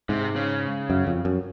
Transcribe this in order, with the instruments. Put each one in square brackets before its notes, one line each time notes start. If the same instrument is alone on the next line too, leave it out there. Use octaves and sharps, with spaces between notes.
[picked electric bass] G#2 [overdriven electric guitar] C3
[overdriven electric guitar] C#3
[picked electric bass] F#2
F2
F#2